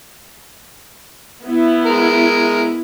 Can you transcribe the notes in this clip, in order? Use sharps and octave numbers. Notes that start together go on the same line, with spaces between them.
B3 E4
G#3 A#4